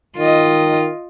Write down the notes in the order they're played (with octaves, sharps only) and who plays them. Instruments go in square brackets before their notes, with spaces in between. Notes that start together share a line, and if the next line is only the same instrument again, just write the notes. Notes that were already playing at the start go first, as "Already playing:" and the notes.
[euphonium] D#3 [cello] F4 D#5